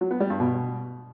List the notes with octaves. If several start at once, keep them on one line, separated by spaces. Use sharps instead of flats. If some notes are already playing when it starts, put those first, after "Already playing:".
F#3
B3
G3
G2
B2